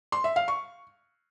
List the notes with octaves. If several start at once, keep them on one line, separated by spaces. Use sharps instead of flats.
C6
E5
F5
C#6